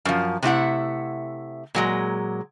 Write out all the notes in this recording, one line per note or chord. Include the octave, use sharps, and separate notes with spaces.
F#2 F3
C3 A3 E4 F#5
A#2 F#3 G#3